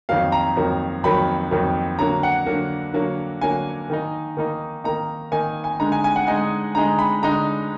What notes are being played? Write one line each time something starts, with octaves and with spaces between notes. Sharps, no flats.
F2 D#3 F#3 A#3 F5
A#5
F2 D#3 F#3 A#3
F2 D#3 F#3 A#3 B5
F2 D#3 F#3 A#3
D3 F#3 A#3 A#5
F#5
D3 F#3 A#3
D3 F#3 A#3
D3 F#3 A#3 G#5
D#3 A#3 D#4
D#3 A#3 D#4
D#3 A#3 D#4 A#5
D#3 A#3 D#4 G#5
G#5
D3 G#3 D#4 A#5
G#5
G#5
F#5
D3 G#3 D#4 G#5
D3 G#3 D#4 A#5
B5
D3 G#3 D#4 A#5